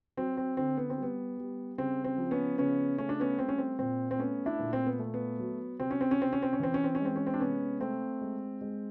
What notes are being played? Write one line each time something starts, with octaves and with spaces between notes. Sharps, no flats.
F#3 C4
C4
D3 C4
B3
C4
G3 B3
G3
C#3 C4
C4
F3
B3 C#4
C#3 B3 C#4
A3 C#4
D4
B3 C#4
G3 C4
C#4
C4
A#2 C4
C4
A3 B3 C#4
D4 E4
A#2
C4
B3
A3
B3
F#3
C3 C4
C#4
C4
C#4
C3 C4
C#4
C4
C#4
E3 C4
C#4
C4
C#4
G#3 C4
C#4
C4
D4
C3 B3 C#4
A3 C4
G#3
G#3